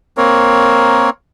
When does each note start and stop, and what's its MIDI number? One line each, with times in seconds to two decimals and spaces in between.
0.17 1.10 58
0.17 1.10 60
0.17 1.10 70
0.17 1.10 73